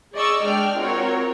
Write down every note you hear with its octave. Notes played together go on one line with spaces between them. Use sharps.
G#4 D5 D#5 C#6 D#6 E6
G#3 D4 D5 G5 F6
C4 F4 F#4 A#4 C#5